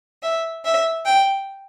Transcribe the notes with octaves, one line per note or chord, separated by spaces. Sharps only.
E5
E5
G5